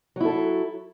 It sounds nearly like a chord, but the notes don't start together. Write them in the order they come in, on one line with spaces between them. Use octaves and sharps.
F#3 E4 A4